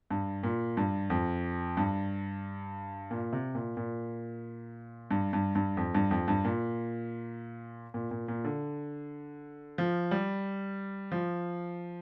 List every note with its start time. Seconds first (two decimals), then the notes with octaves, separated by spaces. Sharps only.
0.11 G2
0.43 A#2
0.77 G2
1.10 F2
1.77 G2
3.11 A#2
3.33 C3
3.55 A#2
3.77 A#2
5.11 G2
5.33 G2
5.55 G2
5.77 F2
5.95 G2
6.11 F2
6.28 G2
6.45 A#2
7.94 A#2
8.11 A#2
8.28 A#2
8.45 D3
9.78 F3
10.11 G3
11.12 F3